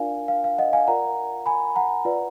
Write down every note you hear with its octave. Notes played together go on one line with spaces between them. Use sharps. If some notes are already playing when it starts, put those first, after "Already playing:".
Already playing: D4 F4 A#4 D5 F5 G#5
F5
F5
D#5 F#5
F5 G#5
F4 A#4 D5 F#5 A#5
G#5 B5
F#5 A#5
F4 B4 D5